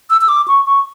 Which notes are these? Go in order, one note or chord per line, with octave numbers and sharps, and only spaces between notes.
E6
E6
D6
C#6
C#6